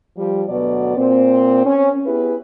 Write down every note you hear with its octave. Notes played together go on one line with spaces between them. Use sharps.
F3 G3
D2 B2 F#3 B3 D5
A#2 C4
C#4
B3 E4 G4 G#4 B4